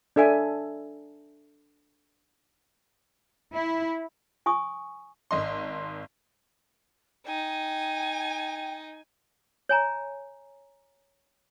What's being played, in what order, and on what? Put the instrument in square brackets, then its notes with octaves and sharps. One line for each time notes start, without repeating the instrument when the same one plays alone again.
[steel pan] D4 A4 E5 G#5
[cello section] E4
[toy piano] G#5 C#6 D#6
[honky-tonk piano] G#1 D#5 C6
[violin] D#4 [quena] G5 [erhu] G#5
[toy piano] C#5 G#5 A#5